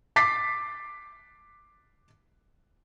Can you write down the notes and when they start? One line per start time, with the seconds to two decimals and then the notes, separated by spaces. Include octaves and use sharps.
0.16 D6 A6 B6 C7